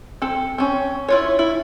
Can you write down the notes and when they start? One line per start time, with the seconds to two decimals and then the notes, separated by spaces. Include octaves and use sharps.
0.22 C4 A4
0.58 C4 C#4
1.09 E4 F4 C#5
1.39 E4